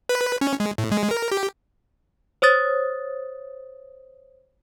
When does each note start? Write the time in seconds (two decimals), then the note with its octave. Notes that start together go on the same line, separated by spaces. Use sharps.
0.09 B4
0.41 C#4
0.60 G#3
0.78 A2
0.92 G#3
1.11 A#4
1.32 G4
2.42 C5 C#5 D#6 A6